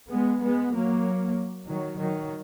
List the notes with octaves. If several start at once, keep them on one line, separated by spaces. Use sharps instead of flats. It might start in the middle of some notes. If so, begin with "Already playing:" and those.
G#3 B3
G#3 B3
F#3 A#3
D#3 F#3
D#3 F#3